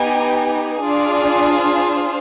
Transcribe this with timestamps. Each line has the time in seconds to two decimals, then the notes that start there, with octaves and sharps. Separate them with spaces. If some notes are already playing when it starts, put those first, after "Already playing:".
Already playing: B3 D#4 G4 G#5
0.81 D4 F4 G#4 D5
1.57 C5